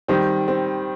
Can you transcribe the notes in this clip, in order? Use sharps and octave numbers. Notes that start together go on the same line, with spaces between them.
D#3 G3 C4
C4